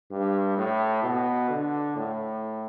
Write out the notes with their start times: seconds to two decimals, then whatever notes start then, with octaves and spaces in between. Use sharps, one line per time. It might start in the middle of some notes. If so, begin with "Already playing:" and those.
0.11 G2
0.58 A2
1.03 B2
1.50 D3
1.96 A2